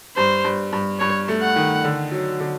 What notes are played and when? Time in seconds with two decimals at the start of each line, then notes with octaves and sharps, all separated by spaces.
0.16 G2 C5
0.44 G2
0.72 G2
1.00 G2 C#5
1.28 A3
1.42 F#5
1.56 D#3
1.84 D3
2.11 F#3
2.40 D3